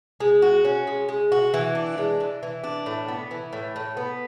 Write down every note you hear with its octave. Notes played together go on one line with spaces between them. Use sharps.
G#3
F#4
C#4
G#3
G#3
F#4
E3
D4
G#3
E3
E3
D4
A2
B3
E3
A2
A2
B3